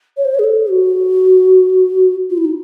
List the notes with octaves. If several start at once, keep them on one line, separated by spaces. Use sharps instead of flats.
C#5
C5
C#5
G#4
A4
F#4
F4
E4
D#4